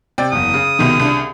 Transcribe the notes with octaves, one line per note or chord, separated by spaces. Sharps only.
C3 D5 G5
F#1 E2 D#6
C#3
C2 B2 D#3
C2 D4